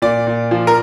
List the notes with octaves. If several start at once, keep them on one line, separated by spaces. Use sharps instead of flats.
A#2 D5
A#2
F3
A#4